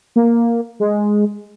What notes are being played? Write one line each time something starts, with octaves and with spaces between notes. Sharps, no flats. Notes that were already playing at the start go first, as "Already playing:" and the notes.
A#3
G#3